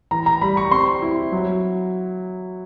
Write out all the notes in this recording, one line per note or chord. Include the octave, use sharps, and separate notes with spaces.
E3 A#5
A#5
G3 B5
C#6
C4 C6
E4
F#3